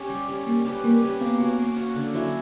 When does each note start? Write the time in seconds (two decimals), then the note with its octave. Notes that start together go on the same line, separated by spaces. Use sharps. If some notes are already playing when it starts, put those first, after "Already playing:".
Already playing: C#4 G4
0.09 G3
0.28 C#4 G4
0.46 G3 A#3
0.65 C#4 G4 B4
0.84 G3 A#3
1.02 C#4 G4 B4
1.21 A#3 B3
1.39 C#4 F#4
1.59 A#3
1.76 C#4 F#4
1.96 D3
2.14 F#3 C#4 E4